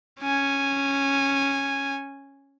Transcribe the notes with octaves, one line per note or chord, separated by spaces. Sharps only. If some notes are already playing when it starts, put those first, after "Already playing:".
C#4 G#5